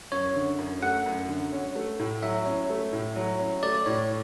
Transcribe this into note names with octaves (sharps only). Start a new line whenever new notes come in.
F#2 C#5
D3
F#2
A3 F#5
F#2
D3
C#4
A3
A2
F#3 E5
C#4
A3
A2
F#3
C#4
A3 D5
A2 C#5